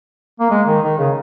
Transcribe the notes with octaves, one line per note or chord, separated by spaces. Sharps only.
A#3
G#3
D#3
D#3
C#3